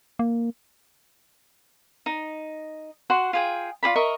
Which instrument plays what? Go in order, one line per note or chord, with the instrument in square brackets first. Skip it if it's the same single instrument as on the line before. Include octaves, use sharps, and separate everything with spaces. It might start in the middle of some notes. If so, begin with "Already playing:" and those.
[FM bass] A#3
[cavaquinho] D#4
F#4 F#5 C6
F4 G#4 G5
F4 G#4 D5 B5
A#4 D#5 E5 C#6